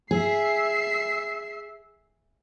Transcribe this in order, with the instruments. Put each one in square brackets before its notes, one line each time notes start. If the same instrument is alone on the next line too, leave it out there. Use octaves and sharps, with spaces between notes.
[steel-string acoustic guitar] G#4 [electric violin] E5 C7